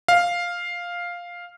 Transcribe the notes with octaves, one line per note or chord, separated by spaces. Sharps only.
F5